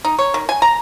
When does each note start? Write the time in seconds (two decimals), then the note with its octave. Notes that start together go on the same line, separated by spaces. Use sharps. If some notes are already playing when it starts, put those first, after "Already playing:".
0.05 D#4
0.19 C#5
0.34 D#3
0.49 G#5
0.62 A#5